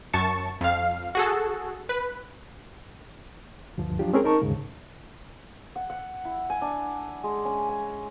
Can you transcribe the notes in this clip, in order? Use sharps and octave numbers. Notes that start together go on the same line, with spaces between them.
F#2 A5 C#6
F2 F5
F#4 G#4 A4
B4
D2 G2 F3
F3 F#3 D4 F4 G4
G#3 C4 C#4 G#4 A#4
D#4 A#4 A5 C#6
D#2 G#2 C#3
F#5
F#5
E4
G#5
D4
G#3
C#4
G#5